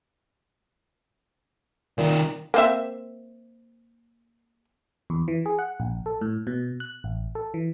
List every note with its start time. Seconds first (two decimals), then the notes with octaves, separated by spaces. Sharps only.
1.98 C2 A#2 D#3
2.54 A#3 C4 E5
5.10 E2
5.28 E3
5.46 G#4
5.59 F#5
5.80 A#1
6.06 A4
6.21 A2
6.47 B2
6.80 F#6
7.04 A1
7.35 A4
7.54 E3